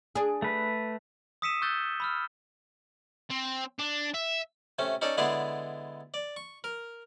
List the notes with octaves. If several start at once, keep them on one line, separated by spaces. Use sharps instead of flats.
D4 G#4
A3 B4
D#6 E6 B6 C#7 D#7 E7
C#6 E6 F#6 G6 A6 G7
B5 E6 F6
C4
D4
E5
C3 A3 C#4
C#4 D#4 A4 C#5 D5
D3 G#3 B3 E4 D5 C6
D5
C#6
A#4